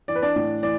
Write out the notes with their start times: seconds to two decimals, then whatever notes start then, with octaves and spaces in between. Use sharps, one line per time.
0.08 E3 D5
0.16 B4
0.22 D4 D5
0.36 A2
0.62 E3 D5